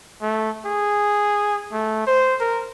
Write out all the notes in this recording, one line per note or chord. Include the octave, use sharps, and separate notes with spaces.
A3
G#4
A3
C5
A#4